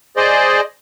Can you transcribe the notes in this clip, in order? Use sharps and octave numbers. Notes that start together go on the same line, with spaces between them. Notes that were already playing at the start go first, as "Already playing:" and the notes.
G#4 C5 D5 D#5